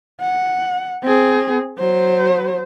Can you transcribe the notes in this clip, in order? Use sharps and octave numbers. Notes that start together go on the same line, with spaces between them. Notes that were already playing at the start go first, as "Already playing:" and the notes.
F#5
C4 G#4
F#3 C5